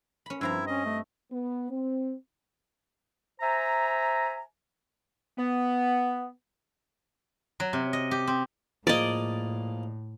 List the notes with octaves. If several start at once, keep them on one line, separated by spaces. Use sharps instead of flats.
C#4 B5
G2 F3 C4 E4 A#5
C#4 D#5
A3
B3
C4
C5 E5 G#5 A#5
B3
F#3
C3
D#5
G4
C4
A2 F3 A#3 G#4 D5 D#5